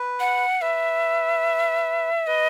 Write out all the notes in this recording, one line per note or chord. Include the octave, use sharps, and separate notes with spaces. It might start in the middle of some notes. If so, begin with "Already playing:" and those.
Already playing: B4
F#5
B4 E5
B4 D#5